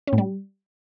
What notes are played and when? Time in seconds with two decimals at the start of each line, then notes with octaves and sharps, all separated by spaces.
0.07 C#4
0.13 A2
0.18 G3